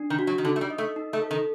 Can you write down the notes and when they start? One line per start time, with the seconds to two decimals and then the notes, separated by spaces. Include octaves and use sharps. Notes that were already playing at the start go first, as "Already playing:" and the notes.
Already playing: D4
0.10 D#3
0.19 F#4
0.27 F#3
0.38 D#3
0.45 D3 D#4
0.56 A3
0.61 G3
0.70 D#5
0.78 A3
0.96 D#4
1.13 A3
1.22 A4
1.31 D#3